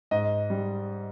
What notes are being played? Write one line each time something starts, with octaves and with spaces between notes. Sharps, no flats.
G#2 D#5
G3